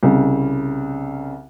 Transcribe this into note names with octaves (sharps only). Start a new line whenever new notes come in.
C2 C#3